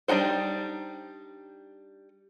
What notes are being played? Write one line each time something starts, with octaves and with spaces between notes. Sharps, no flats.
G3 D4 D#4 F#4 C5